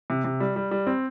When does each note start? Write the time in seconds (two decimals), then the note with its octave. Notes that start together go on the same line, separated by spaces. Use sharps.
0.10 C3
0.24 C3
0.40 G3
0.56 G3
0.71 G3
0.87 C4